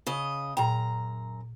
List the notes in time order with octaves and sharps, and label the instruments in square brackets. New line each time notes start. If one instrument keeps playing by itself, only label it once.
[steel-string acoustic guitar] C#3 D#5
[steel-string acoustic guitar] F#2 A#5 [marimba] A#2 G5